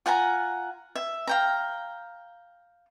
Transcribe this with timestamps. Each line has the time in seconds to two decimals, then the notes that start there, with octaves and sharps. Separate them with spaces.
0.06 F4 F#5 G#5 A#5
0.95 E5
1.27 F5 G5 A#5